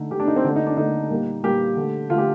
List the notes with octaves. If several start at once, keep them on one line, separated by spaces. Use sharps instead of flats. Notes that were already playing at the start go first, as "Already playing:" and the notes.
Already playing: D3 A3 D#4
D3 A3 G4
D4
D#4
C4
D3 A3 D4
D#4
D4
D3 A3 D#4
A#2 G3 A#3
A#2 G3 A#3 G4
D3 A3
D3 A3 F4
G4